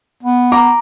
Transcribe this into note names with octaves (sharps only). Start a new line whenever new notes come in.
B3
A#5 D6